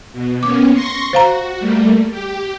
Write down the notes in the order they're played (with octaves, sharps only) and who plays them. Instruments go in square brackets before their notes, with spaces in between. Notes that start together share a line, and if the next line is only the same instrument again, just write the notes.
[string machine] B2
[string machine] A#3 B3 C#4 [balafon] D6
[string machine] C6 C#6 A#6
[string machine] F#4 [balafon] C5 F5 A#5
[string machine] G3 A3 A#3
G4